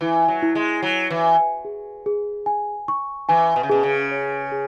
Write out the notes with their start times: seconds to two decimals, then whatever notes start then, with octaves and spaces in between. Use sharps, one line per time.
0.01 E3 E4
0.28 F#3
0.42 E4
0.55 G#3
0.83 F#3 C#5
1.10 E3
1.24 G#5
1.65 G#4
2.06 G#4
2.46 G#5
2.88 C#6
3.29 E3 G#5
3.56 B2
3.63 C#3
3.70 B2 G#4
3.83 C#3
4.11 C#5
4.52 G#4